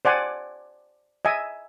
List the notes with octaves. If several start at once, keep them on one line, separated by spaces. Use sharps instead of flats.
C5 D5 F#5 G#5
D#5 E5 G#5